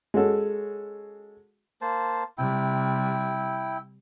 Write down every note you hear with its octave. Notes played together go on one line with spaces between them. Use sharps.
G#3 C#4 F#4 A4
A#3 C5 A5
C3 G3 E4 G5